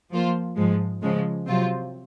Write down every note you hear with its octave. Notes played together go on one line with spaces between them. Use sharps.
F3 A#3 F4 C5
G#2 F3 G#3
C#3 F3 G#3
C3 F#3 C4 F4